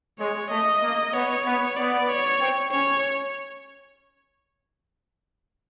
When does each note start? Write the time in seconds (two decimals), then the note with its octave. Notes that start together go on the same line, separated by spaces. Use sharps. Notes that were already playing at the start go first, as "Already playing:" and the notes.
0.18 G#3 C#5
0.50 A3 D#5
0.82 A#3
1.13 B3 C#5
1.45 B3
1.76 B3 D5
2.09 C#5
2.40 C4
2.71 C#4 C#5